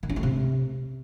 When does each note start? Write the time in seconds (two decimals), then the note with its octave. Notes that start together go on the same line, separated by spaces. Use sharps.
0.03 D#3
0.10 C#4
0.16 A3
0.23 C3